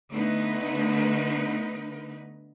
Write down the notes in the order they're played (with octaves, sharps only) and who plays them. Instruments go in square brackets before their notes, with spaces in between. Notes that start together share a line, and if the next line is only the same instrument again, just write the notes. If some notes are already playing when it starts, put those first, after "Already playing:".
[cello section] D3 A3 B3 D#4 B4